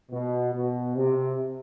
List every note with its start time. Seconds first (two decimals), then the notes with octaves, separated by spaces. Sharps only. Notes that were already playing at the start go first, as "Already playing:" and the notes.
0.11 B2
0.53 B2
0.95 C3